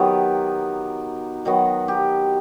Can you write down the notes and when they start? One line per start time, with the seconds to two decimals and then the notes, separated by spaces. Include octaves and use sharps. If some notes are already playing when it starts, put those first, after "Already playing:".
Already playing: D#3 F#3 B3 G4
1.45 D#3 F#3 B3 F#4
1.88 G4